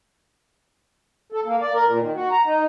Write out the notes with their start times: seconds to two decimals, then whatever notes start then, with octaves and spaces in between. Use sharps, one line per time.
1.32 A4
1.45 A#3
1.61 D5
1.74 A#4
1.87 A#2
2.00 D#3
2.15 F#4
2.31 A#5
2.46 D#4